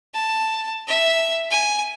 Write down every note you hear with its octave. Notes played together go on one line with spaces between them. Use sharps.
A5
E5
G#5